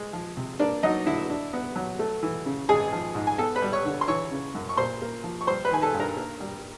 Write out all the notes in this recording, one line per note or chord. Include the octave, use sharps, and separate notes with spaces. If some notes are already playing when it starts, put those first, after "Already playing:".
Already playing: G#3
F3
C3
A#3 D4 D5
F#3 D#4 D#5
D3 E4 E5
D4
B3
F#3
A3
E3
C#3
G#1 G#4 G#5
F3
G#2
G#5
B3 A4 A5
B4 B5
G3
C#5 C#6
D3
C6
E3 C#5 C#6
C#3
F#2
C#6
A#2 C5 C6
A#3
F3
C#6
G3 C5 C6
B4 B5
D#3 G#5
A4 A5
G2
A#4 A#5
A#3
G3